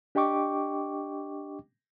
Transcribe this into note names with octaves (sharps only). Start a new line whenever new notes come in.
D4 G4 D#5 G5 C#6 D6